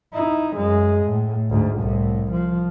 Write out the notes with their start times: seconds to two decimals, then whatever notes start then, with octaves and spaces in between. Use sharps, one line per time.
0.14 D#4 E4
0.57 F#2 G#3
1.05 A2
1.50 D2 G#2
1.80 C2 A2
2.32 F3